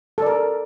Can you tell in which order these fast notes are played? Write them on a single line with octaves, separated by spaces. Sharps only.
A4 D5 A#4